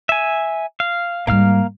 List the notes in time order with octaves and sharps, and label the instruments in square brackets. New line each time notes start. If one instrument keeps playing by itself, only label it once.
[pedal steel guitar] E5 G#5
F5
[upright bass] G#2 G3 [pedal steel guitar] A#3 F5 F6